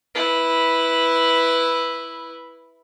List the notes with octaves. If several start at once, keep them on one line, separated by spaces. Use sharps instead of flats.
E4 B4